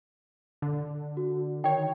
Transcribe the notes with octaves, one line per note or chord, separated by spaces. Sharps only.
D3
F#4
D#3 C#5 G5